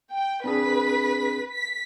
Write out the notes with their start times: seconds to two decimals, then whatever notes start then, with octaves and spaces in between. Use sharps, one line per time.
0.12 G5
0.44 C4 D4 G#4 B4 B6
1.50 B6